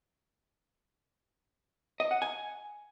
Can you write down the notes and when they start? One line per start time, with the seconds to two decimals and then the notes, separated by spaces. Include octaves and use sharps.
2.00 D#5
2.11 F#5
2.22 G#5